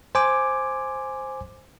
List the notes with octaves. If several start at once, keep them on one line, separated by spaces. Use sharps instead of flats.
C5 G#5 D6